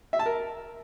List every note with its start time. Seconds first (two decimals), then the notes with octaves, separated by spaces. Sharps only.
0.13 E5
0.19 A5
0.26 A#4